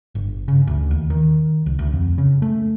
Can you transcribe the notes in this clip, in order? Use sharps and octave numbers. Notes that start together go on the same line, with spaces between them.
G1
C#3
D2
D#2
D#3
C2
D2
F2
C#3
A3